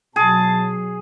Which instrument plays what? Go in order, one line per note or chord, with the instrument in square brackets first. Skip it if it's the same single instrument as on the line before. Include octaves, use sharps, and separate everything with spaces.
[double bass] B2 F#3 [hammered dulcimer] G#4 [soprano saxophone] A5